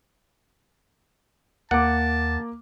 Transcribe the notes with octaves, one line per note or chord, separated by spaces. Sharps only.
D#2 A#3 F#5 A5 D6